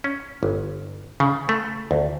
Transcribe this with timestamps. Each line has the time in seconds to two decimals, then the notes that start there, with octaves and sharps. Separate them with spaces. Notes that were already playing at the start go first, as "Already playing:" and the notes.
0.04 C#4
0.43 G1
1.20 C#3
1.49 A3
1.91 D2